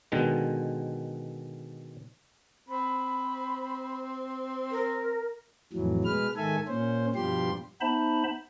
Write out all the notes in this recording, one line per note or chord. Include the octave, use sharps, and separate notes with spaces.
B2 D3 D#3 G#3
C4 B5
A#4
F2 A2 E3 F#3
B2 G#3 B4 F6
G#2 D#3 A4 E5 G#5
A#2 C#4 C5
G2 B2 F3 G3 G4 C6
B3 D#4 C5 E5 A5 B5